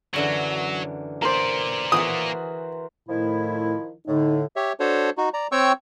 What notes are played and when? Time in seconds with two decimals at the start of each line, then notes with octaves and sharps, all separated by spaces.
0.14 F#2 D3 E3 F#3
1.22 A#3 A#4 C5 D5
1.92 E3 F#4 G#4 D#6
3.09 A2 D#3 F3 E4
4.08 A2 D3 D#4
4.56 G4 C#5 E5
4.80 D4 F#4 A4 C5 C#5
5.17 D#4 F#4
5.34 D5 A#5
5.52 C4 C#5 G5 C#6 E6